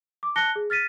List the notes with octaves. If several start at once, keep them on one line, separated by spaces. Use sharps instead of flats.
D6
A5 F#6 A#6 C#7 G7
G#4
F6 A6 B6 D#7